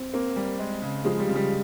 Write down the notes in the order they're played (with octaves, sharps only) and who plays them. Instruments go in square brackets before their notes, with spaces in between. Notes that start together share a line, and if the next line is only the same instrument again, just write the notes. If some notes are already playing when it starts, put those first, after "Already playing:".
Already playing: [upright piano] C4
[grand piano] A#3 [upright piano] C4
[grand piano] G3
G#3
C#3
[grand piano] F3 [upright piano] G#3
[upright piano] G3
[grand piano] C#3
[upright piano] G3